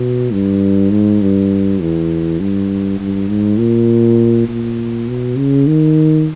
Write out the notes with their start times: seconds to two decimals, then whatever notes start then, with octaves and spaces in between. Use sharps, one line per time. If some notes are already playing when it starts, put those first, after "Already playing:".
Already playing: B2
0.33 G2
0.91 G#2
1.22 G2
1.81 E2
2.40 G2
3.00 G2
3.29 G#2
3.59 A#2
4.49 A#2
5.08 B2
5.38 C#3
5.67 D#3